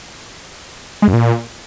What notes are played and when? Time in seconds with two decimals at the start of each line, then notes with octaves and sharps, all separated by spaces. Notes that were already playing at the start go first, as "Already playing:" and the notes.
1.02 G#3
1.08 F#2
1.13 A#2